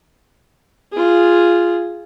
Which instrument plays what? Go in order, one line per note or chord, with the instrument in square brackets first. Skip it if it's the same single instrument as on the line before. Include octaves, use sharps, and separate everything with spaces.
[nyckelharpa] F4 G#4